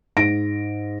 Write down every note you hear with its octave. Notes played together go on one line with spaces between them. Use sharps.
G#2 A#6 D7